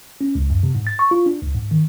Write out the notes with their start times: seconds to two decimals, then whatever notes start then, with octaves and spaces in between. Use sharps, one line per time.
0.21 C#4
0.35 C#2
0.50 F#2
0.63 C3
0.75 G#2
0.87 A6
0.99 C#6
1.11 F4
1.26 D4
1.42 C#2
1.55 G#2
1.71 D#3